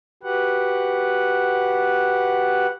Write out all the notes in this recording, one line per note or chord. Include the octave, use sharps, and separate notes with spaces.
F#4 G4 B4 F#5